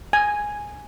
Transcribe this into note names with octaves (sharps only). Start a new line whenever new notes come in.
G#5